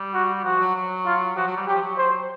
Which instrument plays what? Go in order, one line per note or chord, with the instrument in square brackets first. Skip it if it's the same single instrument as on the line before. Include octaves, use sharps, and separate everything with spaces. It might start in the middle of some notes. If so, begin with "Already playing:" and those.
Already playing: [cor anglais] G3
[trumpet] F#4
[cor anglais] F3 [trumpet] F#4
[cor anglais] F#3
F#3
[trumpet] F4
[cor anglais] F3 [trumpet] F#4
[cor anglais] F#3
G3
[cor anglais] F#3 [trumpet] G4
[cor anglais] F3
F#3
[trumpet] C5